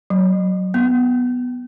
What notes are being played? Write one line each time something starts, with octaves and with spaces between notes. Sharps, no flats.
F#3
B3